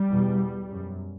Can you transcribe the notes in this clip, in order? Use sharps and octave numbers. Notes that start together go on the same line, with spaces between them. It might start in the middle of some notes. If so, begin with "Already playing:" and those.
Already playing: G3
E2 B2
F#2